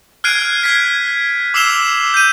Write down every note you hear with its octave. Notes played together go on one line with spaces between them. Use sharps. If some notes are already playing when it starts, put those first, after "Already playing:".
F6 F#6 G#6 C7 D7 D#7
G#6 B6
D6 E6 C7 E7 F7 G7
G6 D#7